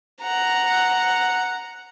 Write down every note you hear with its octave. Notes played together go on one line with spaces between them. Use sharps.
F#5 A#5